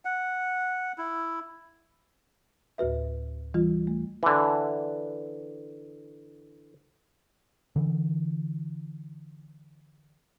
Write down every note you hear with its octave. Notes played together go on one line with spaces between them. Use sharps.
F#5
E4
D2 A2 F#4 B4 E5
E3 G3 F4
A3
D3 E3
D3 E3